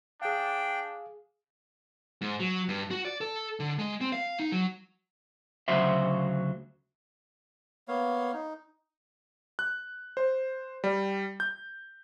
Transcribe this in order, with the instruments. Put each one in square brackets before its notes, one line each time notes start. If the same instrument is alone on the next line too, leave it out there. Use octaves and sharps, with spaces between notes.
[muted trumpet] D4 [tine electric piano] G#4 F5 [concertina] G5
[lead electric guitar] G#2
F#3
G2
F#4
D5
A4
D3
G#3
C4
F5
D#4
F#3
[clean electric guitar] D2 C#3 F#3 F#4 C5 E5
[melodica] A#3 B3 C#5 F5
D#4
[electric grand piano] F#6
C5
G3
G6